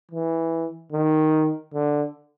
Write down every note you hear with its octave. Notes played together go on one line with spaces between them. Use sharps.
E3
D#3
D3